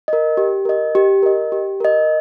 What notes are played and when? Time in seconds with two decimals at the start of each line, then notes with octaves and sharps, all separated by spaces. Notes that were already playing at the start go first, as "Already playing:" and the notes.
0.08 A#4 D#5
0.37 G4
0.65 A#4 D#5
0.95 G4
1.23 A#4 D#5
1.52 G4
1.80 A#4 D#5